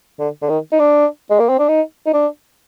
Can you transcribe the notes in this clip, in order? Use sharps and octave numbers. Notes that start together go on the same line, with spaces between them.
D3
D3
D#3
D#4
D4
G#3
A#3
C4
D4
D#4
D#4
D4